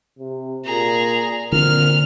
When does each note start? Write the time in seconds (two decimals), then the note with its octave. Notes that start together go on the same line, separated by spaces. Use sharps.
0.19 C3
0.65 A#2 G#4 A#5
1.52 A#2 D3 C4 F6